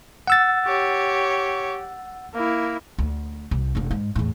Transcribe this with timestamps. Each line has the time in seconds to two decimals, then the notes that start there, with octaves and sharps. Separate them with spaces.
0.27 F#5 E6 A6
0.65 G4 C#5
2.34 A#3 E4
2.98 D2
3.51 C2
3.75 F1 D4
3.91 G#2
4.16 E2 A2